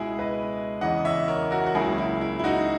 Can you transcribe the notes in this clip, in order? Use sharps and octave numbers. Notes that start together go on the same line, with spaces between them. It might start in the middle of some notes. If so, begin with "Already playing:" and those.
Already playing: C#2 B2 G#3 E4 G#4
B4 D#5
E2 C#3 E3 D#5 F#5
C#5 E5
A#4 C#5
F#4 A#4
F#4
C#2 C#3 F#3 A#3 E4 G#4
E4
E4
E4
D#4 F#4